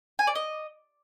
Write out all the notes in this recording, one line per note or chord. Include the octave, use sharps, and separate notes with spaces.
G#5
D5
D#5